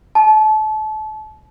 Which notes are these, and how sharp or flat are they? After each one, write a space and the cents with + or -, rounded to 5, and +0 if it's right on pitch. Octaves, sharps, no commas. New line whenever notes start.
A5 -30